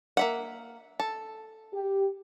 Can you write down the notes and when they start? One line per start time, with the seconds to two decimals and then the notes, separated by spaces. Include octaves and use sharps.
0.17 A#3 E5 F#5
1.00 A4
1.74 G4